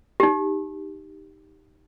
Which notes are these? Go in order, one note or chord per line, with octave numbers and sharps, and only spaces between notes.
D#4 G4